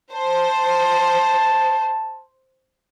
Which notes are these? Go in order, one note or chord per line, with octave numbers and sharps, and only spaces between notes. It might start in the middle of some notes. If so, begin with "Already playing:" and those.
C5 A5